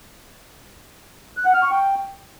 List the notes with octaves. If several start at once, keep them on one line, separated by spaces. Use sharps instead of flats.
F#6
F#5
F6
C#6
G5